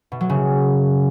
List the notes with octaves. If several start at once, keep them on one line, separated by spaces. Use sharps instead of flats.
B2
F#3
C#3